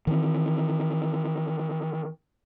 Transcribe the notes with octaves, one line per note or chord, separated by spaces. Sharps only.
D#3 E3 C4